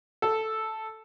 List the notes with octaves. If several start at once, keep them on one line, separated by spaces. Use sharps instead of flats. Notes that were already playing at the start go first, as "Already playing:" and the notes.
A4